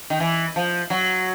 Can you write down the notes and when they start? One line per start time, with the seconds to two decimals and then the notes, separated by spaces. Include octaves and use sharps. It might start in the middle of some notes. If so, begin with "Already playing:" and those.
0.10 D#3
0.20 E3
0.56 F3
0.90 F#3